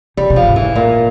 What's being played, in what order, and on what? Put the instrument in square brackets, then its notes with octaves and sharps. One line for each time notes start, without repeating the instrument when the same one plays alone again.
[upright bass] C3 [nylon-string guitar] G3
[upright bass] C3
[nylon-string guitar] F3
[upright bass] G#2
[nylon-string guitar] E3
A#2